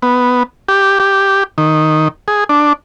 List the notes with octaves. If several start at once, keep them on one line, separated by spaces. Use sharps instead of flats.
B3
G4
G4
D#3
G#4
D4